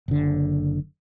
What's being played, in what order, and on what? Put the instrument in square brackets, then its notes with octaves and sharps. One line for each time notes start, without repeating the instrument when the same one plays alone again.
[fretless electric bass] F#1 D3